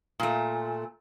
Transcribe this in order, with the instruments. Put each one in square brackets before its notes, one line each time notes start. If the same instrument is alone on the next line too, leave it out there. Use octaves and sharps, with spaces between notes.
[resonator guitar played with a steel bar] A#2 A3